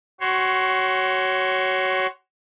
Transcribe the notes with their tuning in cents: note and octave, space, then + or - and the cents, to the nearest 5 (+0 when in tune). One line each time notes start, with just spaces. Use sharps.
F#4 +20 C#5 +0 C6 +0